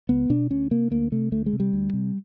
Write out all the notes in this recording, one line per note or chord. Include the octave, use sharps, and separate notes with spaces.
C#2 B3
B2 D4
D2 C#4
C3 A#3
D2 A#3
C3 A3
D2 A3
G#3
C3
G3
D2
C3